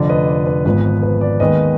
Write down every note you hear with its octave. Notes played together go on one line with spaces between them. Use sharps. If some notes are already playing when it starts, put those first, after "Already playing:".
Already playing: F1 F2 D3 D5
B4 D#5
D5
B4
G#1 G#2 F3 B3 B4
B4
D5
D#2 D#3 G#3 B3 B4 D#5